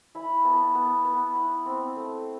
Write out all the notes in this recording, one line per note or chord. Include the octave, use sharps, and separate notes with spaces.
E4 B5
B3 A5
B3
B3
E4 B5
C4
A3